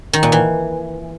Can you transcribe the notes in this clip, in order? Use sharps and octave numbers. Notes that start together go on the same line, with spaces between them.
D#3
A#2
E3